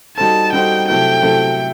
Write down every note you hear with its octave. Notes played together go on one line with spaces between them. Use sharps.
G3 D#4 F#4 A4 C5 A5
G3 D#4 F#4 A4 C5 G5
C3 F#3 A3 E4 A4 G5
C3 F#3 A3 E4 A4